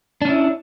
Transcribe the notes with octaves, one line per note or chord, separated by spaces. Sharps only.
C#4 D4 E4